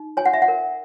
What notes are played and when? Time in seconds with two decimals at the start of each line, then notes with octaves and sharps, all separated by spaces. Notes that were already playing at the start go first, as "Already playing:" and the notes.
Already playing: D#4
0.17 C#5 G#5
0.26 F#5
0.33 E5
0.42 F#5
0.48 A#4